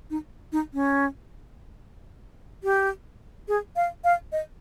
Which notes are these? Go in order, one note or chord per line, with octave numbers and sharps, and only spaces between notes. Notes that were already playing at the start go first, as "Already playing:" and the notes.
D#4
D#4
C#4
G4
G#4
F5
F5
D#5